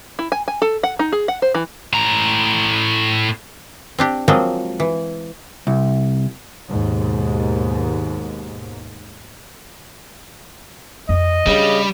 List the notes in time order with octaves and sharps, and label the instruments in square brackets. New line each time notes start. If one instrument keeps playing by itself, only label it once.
[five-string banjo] E4
G#5
G#5
A4
F#5
D#4
G#4
F#5
C5
E3
[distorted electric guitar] A2 A#5
[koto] C4 D4 G4
F3 F#3 G#3 A#3 C4 F4
E3
[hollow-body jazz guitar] C2
[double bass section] D#2 G#2 B2
[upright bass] F2 [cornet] D#5
[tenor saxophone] C#3 [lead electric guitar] G3 [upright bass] D4